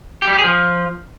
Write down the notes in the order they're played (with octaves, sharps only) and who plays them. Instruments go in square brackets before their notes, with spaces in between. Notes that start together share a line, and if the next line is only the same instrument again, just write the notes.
[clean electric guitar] G4
G3
G4
G#4
F3